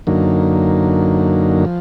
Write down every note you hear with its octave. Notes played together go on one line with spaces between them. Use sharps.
F#2 D3 F#3 A#3 D#4
F3